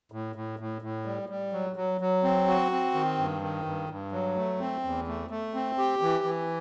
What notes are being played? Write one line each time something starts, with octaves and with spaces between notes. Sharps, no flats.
A2
A2
A2
A2
G3
G3
F#3
F#3
F#3
C4
F#4
C4
D#3
G2
D#3
G2
G2
F#3
A3
C4
E2
A3
A3
C4
G4
E3
E3